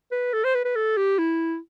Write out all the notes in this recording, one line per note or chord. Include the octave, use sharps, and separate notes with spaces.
B4
A4
C5
B4
B4
A4
G4
E4